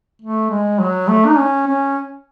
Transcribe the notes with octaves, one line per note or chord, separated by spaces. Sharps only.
A3
G#3
F#3
A3
D#4
C#4
C#4